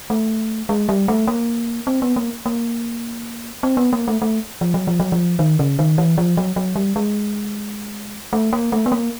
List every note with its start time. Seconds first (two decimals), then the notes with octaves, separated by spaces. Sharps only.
0.10 A3
0.69 G#3
0.89 G3
1.08 A3
1.27 A#3
1.87 C4
2.02 B3
2.16 A#3
2.46 A#3
3.63 C4
3.77 B3
3.93 A#3
4.08 A3
4.22 A3
4.61 F3
4.74 F#3
4.87 F3
5.00 F#3
5.12 F3
5.39 D#3
5.59 C#3
5.79 D#3
5.98 E3
6.18 F3
6.37 F#3
6.56 F#3
6.76 G3
6.96 G#3
8.33 A3
8.53 A#3
8.72 A3
8.86 B3
8.92 A#3